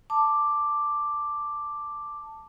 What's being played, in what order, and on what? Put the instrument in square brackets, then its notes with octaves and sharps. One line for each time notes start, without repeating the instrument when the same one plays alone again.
[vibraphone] A5 D6